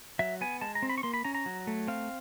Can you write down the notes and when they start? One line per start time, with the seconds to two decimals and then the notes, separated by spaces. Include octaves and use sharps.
0.19 F#3 E5
0.41 B3 G#5
0.61 G#3 A5
0.75 A#5
0.82 C4
0.90 B5
0.98 C#6
1.03 A#3 C6
1.14 B5
1.25 C#4 A#5
1.35 A#5
1.46 F#3
1.67 A3
1.88 C4 F5